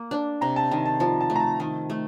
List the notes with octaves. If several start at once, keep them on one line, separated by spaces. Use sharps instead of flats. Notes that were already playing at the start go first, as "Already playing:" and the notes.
Already playing: A#3
D4
C3 A#5
A5
D#3
A5
F3 A5
A5
A3
A#5
A5
D#3 A5
A3